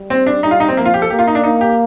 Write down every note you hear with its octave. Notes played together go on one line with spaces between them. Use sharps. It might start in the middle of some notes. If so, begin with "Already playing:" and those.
Already playing: G3
C4
D4
G3 D#4
F4
D#4
C4
F3 A#3
F4
G4
A4
A#3 G4
F4
D#4
D4
A#3 D#4
G4